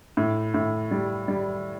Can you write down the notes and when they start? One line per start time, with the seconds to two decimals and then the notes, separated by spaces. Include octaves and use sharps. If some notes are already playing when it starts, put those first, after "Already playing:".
0.17 A2
0.54 A2
0.91 G3
1.28 G3